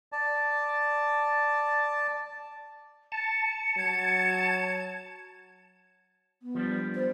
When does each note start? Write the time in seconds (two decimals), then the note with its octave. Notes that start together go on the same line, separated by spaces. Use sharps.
0.12 D5 A5
3.12 A5 C#7
3.78 F#3 G#6
6.42 B3
6.55 F3 G3 D4
6.95 C5